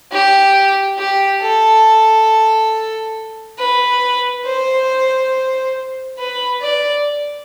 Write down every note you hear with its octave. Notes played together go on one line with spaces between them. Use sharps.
G4
G4
A4
B4
C5
B4
D5